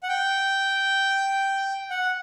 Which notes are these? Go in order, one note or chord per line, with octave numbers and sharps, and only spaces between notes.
F#5
G5
F#5